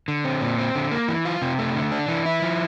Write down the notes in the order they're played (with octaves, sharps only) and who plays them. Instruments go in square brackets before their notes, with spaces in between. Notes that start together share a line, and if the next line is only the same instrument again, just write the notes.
[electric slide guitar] D3
C4
A#2
C4
D3
A#3
E3
F4
C3
A3
D3
D4
E3
E4
F3